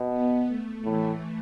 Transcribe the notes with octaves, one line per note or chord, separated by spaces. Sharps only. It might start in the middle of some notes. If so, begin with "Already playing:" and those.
Already playing: B2
B3
A3
A2 E3